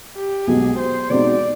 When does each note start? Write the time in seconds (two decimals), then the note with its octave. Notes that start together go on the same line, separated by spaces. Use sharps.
0.16 G4
0.47 B1 B2 G#3 G#4
0.79 C5
1.10 B2 G#3 C4 D#4 D5